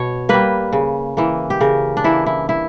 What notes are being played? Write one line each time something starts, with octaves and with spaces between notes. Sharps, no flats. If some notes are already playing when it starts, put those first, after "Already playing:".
Already playing: B2 C#5
G3 A#3 B4
C#3
E3 A#3
G4
C#3 A#4
D4
E3 A#3 E4
E4
E4